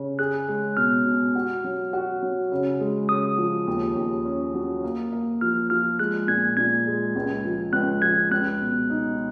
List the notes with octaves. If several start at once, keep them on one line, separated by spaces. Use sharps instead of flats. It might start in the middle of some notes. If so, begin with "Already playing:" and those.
Already playing: C#3
G#4 F#6
G#3
B2 F6
B2
F#4
F#3
F#4
F#3
C#3
G#3
C#3 D#6
F3
D#2
D#2
C#4
F#3
A#3
A#3
F3 F6
F3 F6
G#3 F#6
A#2 G#6
A#2 G#6
G#3
C#2
F3
C#2 F#6
F3 G#6
C#2 F#6
B2
D#4